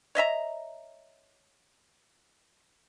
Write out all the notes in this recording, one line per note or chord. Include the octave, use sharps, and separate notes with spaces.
C#5 D#5 E5 A#5